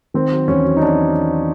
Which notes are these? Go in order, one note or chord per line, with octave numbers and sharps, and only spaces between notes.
D#3 C4
F#3
E2 C#4
F#3
D#4
F#3 D4